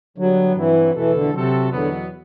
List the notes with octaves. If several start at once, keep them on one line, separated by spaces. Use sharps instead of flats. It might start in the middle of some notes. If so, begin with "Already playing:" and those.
D3 F#3 G3 B3
G2 E3 F#3 C4 E4
E2 B2 E3 A3 E4 A4
D3
C3 F#3 C4 F#4 A4
E2 B2 D3 F#3 B3